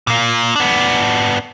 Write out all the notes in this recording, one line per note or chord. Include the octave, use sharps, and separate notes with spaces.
A#2 A#3
B3 D4